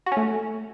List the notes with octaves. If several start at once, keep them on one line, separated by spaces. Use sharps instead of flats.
F#4
C#4
A3